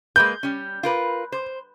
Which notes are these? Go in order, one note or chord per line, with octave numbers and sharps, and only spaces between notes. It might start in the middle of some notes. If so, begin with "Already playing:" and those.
G#3 A#3 B4 G6
G3 C#4
F4 A#4 B4
C5